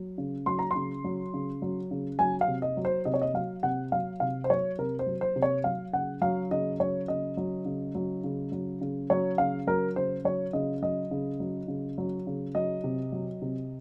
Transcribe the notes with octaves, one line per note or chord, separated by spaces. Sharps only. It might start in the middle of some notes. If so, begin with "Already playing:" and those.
Already playing: F#3
C#3
F#3 C6
A#5
C#3 C6
F#3
C#3
F#3
C#3
F#3 G#5
F5
C3
D#5
F#3
C5
C3 D#5
C#5
D#5
F#3 F5
C3 F#5
F#3 F5
C3 F5
C5
F#3 C#5
C3 A#4
C5
F#3
C5
C3
C#5
F#3 F5
C#3 F#5
F#3 F5
C#3 D#5
F#3 C#5
C#3 D#5
F#3
C#3
F#3
C#3
F#3
C#3
F#3 C#5
C#3 F5
F#3 A#4
C#3 C5
F#3 C#5
C#3 D#5
F#3 D#5
C#3
F#3
C#3
F#3
C#3
F#3 D#5
C3
F#3
C3